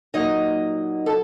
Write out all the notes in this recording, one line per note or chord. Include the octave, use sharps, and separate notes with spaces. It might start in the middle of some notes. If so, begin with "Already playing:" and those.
A#2 F#3 A#3 D#4 D#5
A4 A5